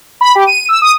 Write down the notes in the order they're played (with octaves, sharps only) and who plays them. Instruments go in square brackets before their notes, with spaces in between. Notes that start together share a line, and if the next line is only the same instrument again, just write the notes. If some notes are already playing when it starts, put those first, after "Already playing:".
[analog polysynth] B5
G4
D#7
E6
D#6